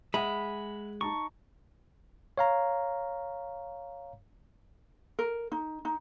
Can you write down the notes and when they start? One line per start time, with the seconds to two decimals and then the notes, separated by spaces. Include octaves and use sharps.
0.14 G#3 E5 F#5 B5
1.01 D#4 A5 A#5 C#6
2.38 C#5 F5 A#5
5.19 A#4
5.52 D#4
5.85 D#4